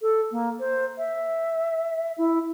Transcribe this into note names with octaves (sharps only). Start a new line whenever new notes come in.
A4
A#3
C5
E5
E4